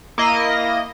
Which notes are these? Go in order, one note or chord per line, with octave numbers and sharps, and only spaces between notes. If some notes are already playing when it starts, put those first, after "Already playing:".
A#3 E4 D#5